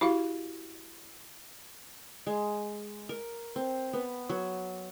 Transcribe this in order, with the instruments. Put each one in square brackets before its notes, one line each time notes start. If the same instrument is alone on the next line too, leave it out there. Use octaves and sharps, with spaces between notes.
[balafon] E4 F#4 G4 F5
[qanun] G#3
A#4
C4
B3
F#3